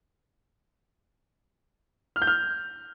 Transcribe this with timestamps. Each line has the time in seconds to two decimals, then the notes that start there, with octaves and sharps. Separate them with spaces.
2.16 F6
2.22 G6
2.27 F6